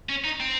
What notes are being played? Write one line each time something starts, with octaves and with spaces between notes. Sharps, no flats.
C#4
D#4
C4